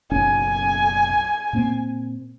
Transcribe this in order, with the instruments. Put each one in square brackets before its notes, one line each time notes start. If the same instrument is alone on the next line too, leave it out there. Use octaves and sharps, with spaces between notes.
[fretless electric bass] F#1 B1 C#4 [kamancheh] G#5
[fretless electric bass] A#2 A#3 C4